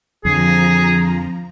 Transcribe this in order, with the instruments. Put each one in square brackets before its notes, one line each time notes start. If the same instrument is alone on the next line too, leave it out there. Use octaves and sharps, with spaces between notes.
[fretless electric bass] F2 D3 [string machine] F3 A#5 [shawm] G#4